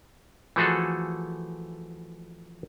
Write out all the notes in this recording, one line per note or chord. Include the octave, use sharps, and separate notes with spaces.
E3 F3 A3 F#4 G#4 A4